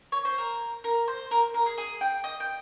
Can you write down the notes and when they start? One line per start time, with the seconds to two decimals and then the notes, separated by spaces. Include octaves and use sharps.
0.12 C#5
0.25 C5
0.38 A#4
0.84 A#4
1.08 C5
1.31 A#4
1.54 A#4
1.66 G#4
1.78 G#4
2.01 G5
2.24 D#5
2.40 G5